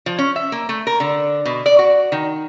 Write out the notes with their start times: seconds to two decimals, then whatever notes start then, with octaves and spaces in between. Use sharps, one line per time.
0.06 F3
0.18 C#4
0.36 E5
0.52 A#3
0.69 A3
0.87 A#4
1.00 D3
1.45 B2
1.66 D5
1.79 F#4
2.12 D#3